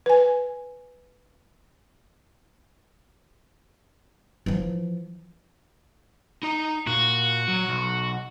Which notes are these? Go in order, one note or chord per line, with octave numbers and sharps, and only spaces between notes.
B4 G#5
E3 F3
D#4 A#5
A#2 F#4
F#3
B1